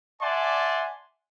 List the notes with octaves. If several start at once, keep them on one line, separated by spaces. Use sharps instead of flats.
D5 E5 F#5 G#5 A5 C6